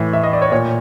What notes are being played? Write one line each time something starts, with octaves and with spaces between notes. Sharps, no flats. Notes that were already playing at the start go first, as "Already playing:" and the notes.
Already playing: A2 E3
E5
D#5
D5
C#5
A#2 C#5